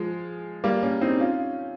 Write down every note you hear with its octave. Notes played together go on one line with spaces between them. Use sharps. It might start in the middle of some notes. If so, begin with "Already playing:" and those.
Already playing: F3 G#3
G3 A#3
A#3 C#4
C4 D#4
C#4 F4